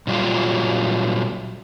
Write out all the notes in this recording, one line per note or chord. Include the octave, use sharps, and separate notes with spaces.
A#2 F#3 G3 F4